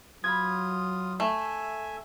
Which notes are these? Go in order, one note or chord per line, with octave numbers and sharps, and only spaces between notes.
F#3 F4 B5 D#6 G#6
A3 E5 G#5